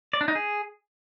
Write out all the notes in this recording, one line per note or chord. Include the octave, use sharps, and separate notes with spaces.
D5
D4
D#4
G#4